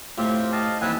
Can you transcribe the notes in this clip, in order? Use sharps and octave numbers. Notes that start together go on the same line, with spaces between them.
A2 C3 C4 F4 G4
D#5 F5 A5
D#2 E3 C4 B4 G#5